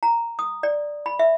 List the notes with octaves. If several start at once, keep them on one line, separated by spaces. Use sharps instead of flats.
A#5
D#6
D5
B5
E5